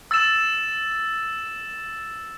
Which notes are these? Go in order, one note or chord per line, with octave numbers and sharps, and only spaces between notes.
E6 A6 E7